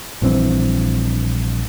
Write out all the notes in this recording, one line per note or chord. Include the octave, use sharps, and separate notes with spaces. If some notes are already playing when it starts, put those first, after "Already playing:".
A#1 G2 E3 C4